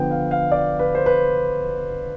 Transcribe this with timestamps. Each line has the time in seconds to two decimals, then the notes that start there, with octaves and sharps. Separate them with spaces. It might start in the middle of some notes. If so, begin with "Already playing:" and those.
Already playing: D3 F3 B3 D4 B4 G5
0.11 F5
0.31 F5
0.52 D5
0.79 B4
0.95 C5
1.06 B4